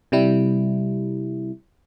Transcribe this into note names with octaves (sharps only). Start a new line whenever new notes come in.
C3 G3 E4